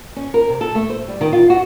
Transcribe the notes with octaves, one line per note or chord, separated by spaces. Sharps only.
C#4
A#4
C3
A4
A3
C5
G3
D#3
F4
F#4